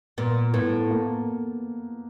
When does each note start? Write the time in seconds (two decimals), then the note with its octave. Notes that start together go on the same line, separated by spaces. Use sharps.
0.18 A#2 B3
0.54 A2 B3
0.91 A#3